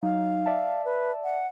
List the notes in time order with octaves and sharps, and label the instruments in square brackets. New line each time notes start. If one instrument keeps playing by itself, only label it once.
[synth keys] F#3 D#4 [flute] F5
[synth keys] D5 E5 A5
[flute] B4
F#5